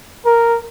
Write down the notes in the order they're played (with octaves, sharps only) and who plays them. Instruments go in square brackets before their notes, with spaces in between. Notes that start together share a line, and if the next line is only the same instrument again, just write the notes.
[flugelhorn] A#4